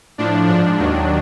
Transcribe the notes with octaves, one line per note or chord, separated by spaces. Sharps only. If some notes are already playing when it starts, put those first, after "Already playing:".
A2 F3 D4
G#2 F3 D4
D#2 D#3 F#3